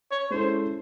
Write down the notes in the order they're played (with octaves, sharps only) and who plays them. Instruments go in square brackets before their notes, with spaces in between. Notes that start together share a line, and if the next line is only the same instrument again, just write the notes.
[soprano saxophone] C#5
[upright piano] G#3 C#4 E4 A4 [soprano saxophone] C5